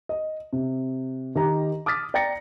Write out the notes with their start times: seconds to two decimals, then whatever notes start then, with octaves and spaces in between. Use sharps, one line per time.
0.09 D#5
0.53 C3
1.35 D#3 G4 D#5 A#5
1.86 D6 D#6 F6 A6 B6
2.14 D5 G5 A#5 A6 A#6 C#7